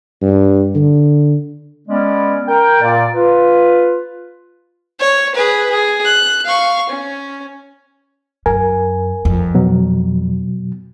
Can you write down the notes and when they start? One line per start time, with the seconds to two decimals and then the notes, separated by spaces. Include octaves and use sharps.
0.22 G2
0.75 D3
1.88 G#3 B3 C#4 D5
2.47 A#4 G5
2.81 A#2 A#3 D5
3.14 F4 B4
5.00 C#5
5.35 G#4 B4
5.70 G#4
6.05 F#6
6.45 F5 C#6
6.89 C#4
8.46 F#2 A#4 G#5
9.25 F2
9.55 B2 F#3